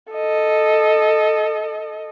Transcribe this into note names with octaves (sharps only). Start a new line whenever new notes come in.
A4 D#5